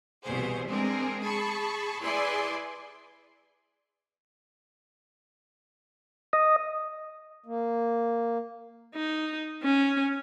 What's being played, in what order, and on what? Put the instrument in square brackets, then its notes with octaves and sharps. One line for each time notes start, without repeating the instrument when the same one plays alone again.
[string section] C2 B2 E3 G#4 C5
G#3 C4 D4 G#4 A#4
G#4 A5 B5 C#6
E4 G#4 B4 D5 G#5 C6
[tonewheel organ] D#5
[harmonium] A#3
[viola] D#4
C#4